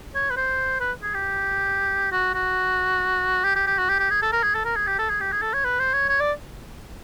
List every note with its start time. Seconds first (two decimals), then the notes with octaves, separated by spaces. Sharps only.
0.15 C#5
0.30 B4
0.37 C5
0.80 B4
1.03 G#4
1.14 G4
2.12 F#4
2.35 F#4
3.44 G4
3.56 G4
3.67 G4
3.78 F#4
3.89 G4
3.99 G4
4.10 G#4
4.22 A4
4.32 A#4
4.43 G#4
4.55 A4
4.65 A#4
4.76 G#4
4.87 G4
4.99 A4
5.10 G#4
5.20 G4
5.32 G#4
5.42 A4
5.54 C#5
5.64 B4
5.79 C5
5.94 C#5
6.09 C#5
6.20 D5